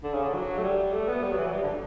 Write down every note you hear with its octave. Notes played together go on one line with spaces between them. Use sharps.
D3
C#3
D3
F#3
A3
G3
A3
B3
G3
F#3
E3
F#3
G3
D3